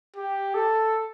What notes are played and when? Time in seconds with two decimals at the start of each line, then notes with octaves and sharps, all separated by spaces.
0.16 G4
0.54 A4